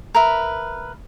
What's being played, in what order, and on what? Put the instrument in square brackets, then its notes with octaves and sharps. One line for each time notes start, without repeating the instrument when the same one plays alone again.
[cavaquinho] A#4 B4 E5